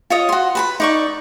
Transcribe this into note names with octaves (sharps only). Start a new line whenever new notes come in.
F4 C#5 D#5
F#4 C6
B4 A5 B5
D#4 D5 C#6